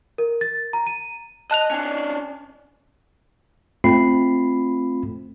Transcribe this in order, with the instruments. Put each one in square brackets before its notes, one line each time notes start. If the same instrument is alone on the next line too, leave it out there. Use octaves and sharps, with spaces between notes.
[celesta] A#4
A6
A#5
D#7
[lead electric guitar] D#5 [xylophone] A5 F#6 F7
[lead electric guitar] C#4 D4
[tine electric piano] A3 C4 F4 B5 C7